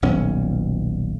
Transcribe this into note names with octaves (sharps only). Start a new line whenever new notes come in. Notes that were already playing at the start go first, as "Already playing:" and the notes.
D#1 B1 C#4